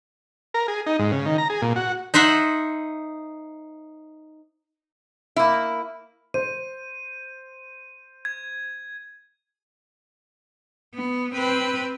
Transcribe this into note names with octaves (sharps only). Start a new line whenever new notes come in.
A#4
G#4
D#4
G#2
C#3
D#3
A#5
G#4
A#2
F#4
D#4 C5 E5 F#5
A#3 E4
C5 D#7
G#6
B3
C4 B4